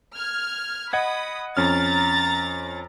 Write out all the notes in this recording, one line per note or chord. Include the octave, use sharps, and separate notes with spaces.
F6 G#6
D#5 F#5 B5 D#6 G#6
F2 C#4 A#5 F6 A6